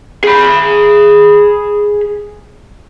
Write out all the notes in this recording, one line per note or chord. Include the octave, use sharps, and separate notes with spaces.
G#4 B5